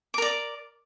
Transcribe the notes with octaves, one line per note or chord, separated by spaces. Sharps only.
A#4 D5 D6